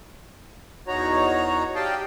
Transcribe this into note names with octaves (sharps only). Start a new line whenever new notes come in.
E2 D#4 F#4 C#5 A#5
G4 D5 D#5 F5 G5 A5